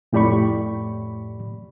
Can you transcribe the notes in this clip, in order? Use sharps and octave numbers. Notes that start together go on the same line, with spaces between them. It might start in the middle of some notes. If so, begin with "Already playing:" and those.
F2 A2 G4 D5 B5 C#6